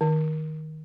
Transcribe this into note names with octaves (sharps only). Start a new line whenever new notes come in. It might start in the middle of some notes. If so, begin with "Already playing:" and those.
D#3